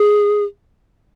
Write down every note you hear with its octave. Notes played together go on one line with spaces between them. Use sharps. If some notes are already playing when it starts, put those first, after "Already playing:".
Already playing: G#4